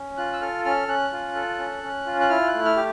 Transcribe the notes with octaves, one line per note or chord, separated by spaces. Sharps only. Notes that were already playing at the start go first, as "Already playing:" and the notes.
Already playing: C#4
F4 F#6
E6
A4 F6
C#4 F6
C#4 F#6
F4
A4
C#4
C#4
F4
F#6
E4 F6
F#6
A3
F6
G4